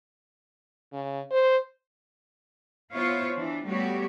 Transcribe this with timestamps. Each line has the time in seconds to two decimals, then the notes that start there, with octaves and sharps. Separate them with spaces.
0.93 C#3
1.31 C5
2.92 B3 E4 F4 C5 C#5
3.34 E3 D4
3.67 G3 A3 B3 F#4 G4 C#5